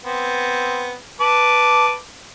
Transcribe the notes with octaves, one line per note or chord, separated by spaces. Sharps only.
B3 C4
B4 A5 D6